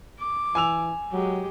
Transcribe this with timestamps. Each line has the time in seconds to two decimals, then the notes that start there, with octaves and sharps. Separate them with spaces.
0.19 D6
0.55 E3 G#5 E6 F7
1.13 F#3 G#3 G4